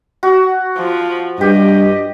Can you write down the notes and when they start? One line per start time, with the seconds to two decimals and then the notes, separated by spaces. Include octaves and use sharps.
0.23 F#4
0.78 F3
1.41 G2 G4 D#5